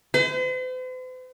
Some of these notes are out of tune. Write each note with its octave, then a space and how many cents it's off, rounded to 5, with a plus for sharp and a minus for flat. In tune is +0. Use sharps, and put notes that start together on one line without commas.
C5 -45